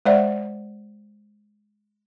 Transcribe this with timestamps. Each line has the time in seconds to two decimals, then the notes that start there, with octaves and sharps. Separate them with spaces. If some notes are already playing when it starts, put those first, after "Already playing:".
0.05 G#3 C5 D5 E5 F#5